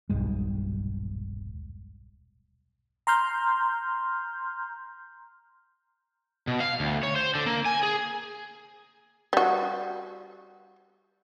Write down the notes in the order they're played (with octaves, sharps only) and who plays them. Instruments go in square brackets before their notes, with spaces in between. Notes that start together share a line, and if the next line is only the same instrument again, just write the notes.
[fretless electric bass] D#1 B1 G2 G#3
[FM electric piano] A#5 C6 F6 G6
[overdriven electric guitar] B2
F5
D2
C#5
C5
D3
A#3
G#5
G#4
[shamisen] G3 F#4